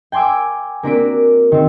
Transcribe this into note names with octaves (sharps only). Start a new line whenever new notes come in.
G5 G#5 C6 D6 E6
A#3 C4 D4 F#4 B6 D7
D#3 C4